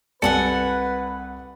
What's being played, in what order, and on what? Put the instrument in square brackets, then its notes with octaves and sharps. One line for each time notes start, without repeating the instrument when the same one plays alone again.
[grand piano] C2 D5 C#7 [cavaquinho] A4 F#5 G#5 [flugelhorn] B4